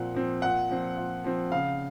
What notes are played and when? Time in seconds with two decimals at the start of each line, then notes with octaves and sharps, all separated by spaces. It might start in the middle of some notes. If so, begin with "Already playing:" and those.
Already playing: A#2 F3 C4 F#5
0.14 F3 C4
0.42 A#2 F#5
0.69 F3 C4
0.97 A#2
1.24 F3 C4
1.51 C#3 F5